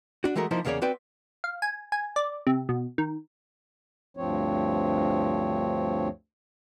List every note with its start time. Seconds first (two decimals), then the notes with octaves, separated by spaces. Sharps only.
0.24 D4 F#4
0.35 E3 G#3 A3 F#4 A#4
0.51 F3 A#3 D#4 E4 C5
0.65 E2 C#3 A#3 G#4 C#5 D5
0.82 C4 F#4 B4 D5 G5
1.44 F5
1.62 G#5
1.92 G#5
2.16 D5
2.47 C3
2.69 B2
2.98 D#3
4.17 D2 G2 F3 C4 C#5